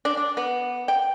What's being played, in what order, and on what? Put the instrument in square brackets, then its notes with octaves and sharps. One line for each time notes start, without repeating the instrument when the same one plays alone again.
[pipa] D4
D4
B3
G5